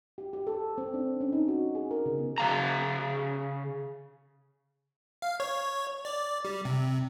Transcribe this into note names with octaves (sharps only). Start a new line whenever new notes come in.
G4
G4
A4
C4
D4
C#4
D#4
F#4
G#4
A#4
C#3
B3
C#3 F5 A#5
F5
C#5
D5
G3
C3